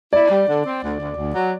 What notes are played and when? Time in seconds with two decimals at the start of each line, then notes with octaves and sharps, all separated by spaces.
0.13 E4 D5
0.30 G3
0.48 D3
0.65 C4
0.82 D2
0.99 D2
1.16 D2
1.34 F#3